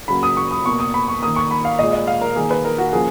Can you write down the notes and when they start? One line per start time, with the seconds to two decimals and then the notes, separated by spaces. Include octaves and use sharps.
0.08 C#3 F#3 A#3 B5
0.23 D#6
0.37 C#6
0.51 D#6
0.65 B2 A#3 C#6
0.80 D#6
0.94 B5
1.08 C#6
1.22 D#3 A#3 D#6
1.36 C#6
1.51 B5
1.65 F5
1.79 A#2 G#3 D#5
1.93 D#5
2.07 F5
2.21 A#4
2.36 D#3 A#3 G#4
2.51 B4
2.65 A#4
2.78 F#4
2.93 C#3 F3 A#3 G#4